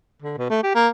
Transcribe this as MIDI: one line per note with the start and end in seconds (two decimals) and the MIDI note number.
0.22 0.38 50
0.38 0.47 47
0.50 0.62 57
0.63 0.74 67
0.75 0.88 58